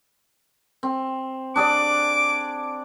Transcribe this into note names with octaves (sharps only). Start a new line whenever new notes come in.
C4
D4 G#4 D5 D6